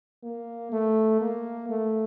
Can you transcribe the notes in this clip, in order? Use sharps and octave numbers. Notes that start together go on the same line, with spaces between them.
A#3
A3
A#3
A3